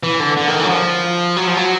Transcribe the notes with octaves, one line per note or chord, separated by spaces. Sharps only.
E3
D3
D3
D#3
E3
F#3
F3
F#3
F3
F#3